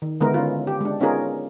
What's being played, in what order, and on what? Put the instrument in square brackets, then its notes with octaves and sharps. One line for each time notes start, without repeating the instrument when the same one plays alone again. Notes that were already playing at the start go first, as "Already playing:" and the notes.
[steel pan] D#3
D3 G#3 B3 D#4 E4 A#4
C#4 F4
G4
G#3 D4
B3 C#4 D#4 F4 G#4 A#4